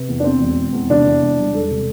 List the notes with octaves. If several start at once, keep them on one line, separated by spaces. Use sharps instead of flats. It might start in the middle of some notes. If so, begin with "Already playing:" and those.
Already playing: C3 B4
E2
D4
E2 C4
E1
E1
E2
C3 D4
E2
E1
G3
E1 A4
C3